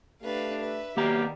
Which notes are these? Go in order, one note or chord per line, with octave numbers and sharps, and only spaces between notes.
A3 D4 G4 B4 F5
B4 E5
D#3 F#3 G3 A#3 B3 G4 A#5